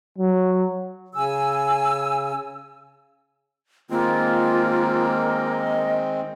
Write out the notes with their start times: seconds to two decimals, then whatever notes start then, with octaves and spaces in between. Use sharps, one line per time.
0.18 F#3
1.15 C#3 G#5 E6
3.90 D#3 G#3 A#3 C4 F4
5.25 D#5